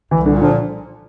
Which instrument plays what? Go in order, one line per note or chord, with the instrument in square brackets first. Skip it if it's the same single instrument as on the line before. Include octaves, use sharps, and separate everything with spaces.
[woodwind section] C2 [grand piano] E3
[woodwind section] A#2 [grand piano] D3
[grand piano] D3 [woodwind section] F3